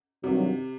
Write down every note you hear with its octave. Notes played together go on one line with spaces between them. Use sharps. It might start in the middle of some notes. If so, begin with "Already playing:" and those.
G2 C3 D#3 F#3